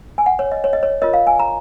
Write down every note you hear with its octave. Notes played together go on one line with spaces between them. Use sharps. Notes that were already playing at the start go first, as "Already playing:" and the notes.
G#5
F#5
C#5
D#5
C#5
D#5
C#5
F4 A#4 C#5 D#5
F5
G#5
A#5